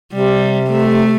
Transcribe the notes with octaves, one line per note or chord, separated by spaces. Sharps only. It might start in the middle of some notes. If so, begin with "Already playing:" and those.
C3 G3
A3